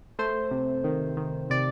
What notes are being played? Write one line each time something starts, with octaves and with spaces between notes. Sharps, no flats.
A3 C5
C3
D#3
D#3
C3 D5